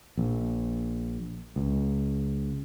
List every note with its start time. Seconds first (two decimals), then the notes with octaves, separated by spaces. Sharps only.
0.17 A#1
1.56 C#2